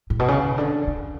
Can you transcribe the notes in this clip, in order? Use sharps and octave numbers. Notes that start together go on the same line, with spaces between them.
A2
B2
C#3
D3
D3